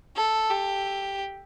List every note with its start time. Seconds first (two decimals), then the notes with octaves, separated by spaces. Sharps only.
0.17 A4
0.50 G4